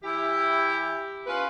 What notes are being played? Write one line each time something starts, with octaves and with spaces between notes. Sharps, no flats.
E3 E4 G4
C#4 F4 B4